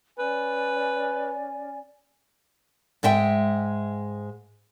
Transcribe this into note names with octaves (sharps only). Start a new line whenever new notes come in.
C#4 B4 D5 G#5
G#2 G#3 E5 G5